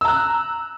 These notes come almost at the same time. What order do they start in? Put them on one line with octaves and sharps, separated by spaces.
E6 A#5 F#6